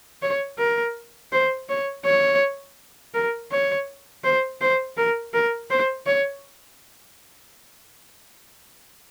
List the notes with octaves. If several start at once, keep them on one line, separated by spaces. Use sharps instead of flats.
C#5
A#4
C5
C#5
C#5
A#4
C#5
C5
C5
A#4
A#4
C5
C#5